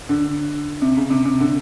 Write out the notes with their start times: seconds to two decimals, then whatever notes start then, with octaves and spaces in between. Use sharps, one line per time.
0.09 D3
0.82 C3
0.97 C#3
1.10 C3
1.25 C3
1.40 D3